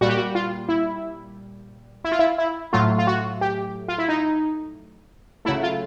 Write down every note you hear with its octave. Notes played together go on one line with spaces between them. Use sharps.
A#2 G3 F#4
G4
F#4
F4
E4
E4
F4
E4
E4
A2 F#3 A3 F4
F4
F#4
G4
F4
E4
D#4
C#3 F#3 A3 E4
F4